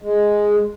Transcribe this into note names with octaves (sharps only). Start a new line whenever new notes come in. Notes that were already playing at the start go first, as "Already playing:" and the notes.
G#3